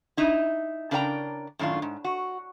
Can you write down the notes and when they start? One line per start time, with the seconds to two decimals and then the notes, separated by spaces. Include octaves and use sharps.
0.17 D#4 E4
0.91 C#3 D4 A#4 D5 G5 A#5
1.59 F#2 A2 D#3 D4 F4
1.82 G#2
2.05 F#4